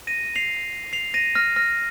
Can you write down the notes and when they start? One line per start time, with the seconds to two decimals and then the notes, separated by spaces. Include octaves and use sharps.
0.07 A#6 D#7
0.36 C7 F7
0.93 C7 F7
1.14 A#6 D#7
1.35 F6 A#6
1.56 F6 A#6